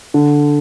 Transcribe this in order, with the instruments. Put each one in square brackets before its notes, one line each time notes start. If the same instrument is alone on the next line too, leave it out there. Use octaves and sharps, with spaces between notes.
[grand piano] D3